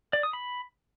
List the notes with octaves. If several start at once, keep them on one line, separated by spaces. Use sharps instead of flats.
D5
D#6
B5